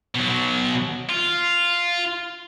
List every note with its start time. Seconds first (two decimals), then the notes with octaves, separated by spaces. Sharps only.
0.15 B2 F#3
1.09 F4